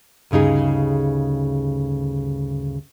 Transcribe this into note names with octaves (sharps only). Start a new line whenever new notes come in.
D2 G2 C#3 D#4 G#4